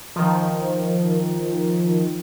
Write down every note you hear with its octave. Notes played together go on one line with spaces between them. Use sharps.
D#3 F3